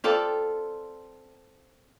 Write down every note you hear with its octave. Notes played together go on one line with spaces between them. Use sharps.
C4 F4 A4 D5